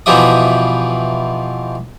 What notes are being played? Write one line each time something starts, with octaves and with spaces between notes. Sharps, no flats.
B2 E3 F3 G4 E5 D#6